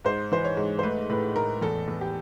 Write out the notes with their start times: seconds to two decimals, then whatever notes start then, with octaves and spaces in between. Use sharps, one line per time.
0.05 G#2 C5
0.32 E3 C5
0.45 C#5
0.57 G#2
0.79 C5
0.83 A3 B4
1.09 A2 B4
1.36 A2 A#4
1.62 E2 A4
1.88 E2
2.01 G4